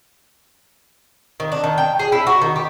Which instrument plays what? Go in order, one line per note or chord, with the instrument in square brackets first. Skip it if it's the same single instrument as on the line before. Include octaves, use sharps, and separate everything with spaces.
[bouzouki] D#3
D4
D#3
G5
G#4
E4
F#4
D#3
G4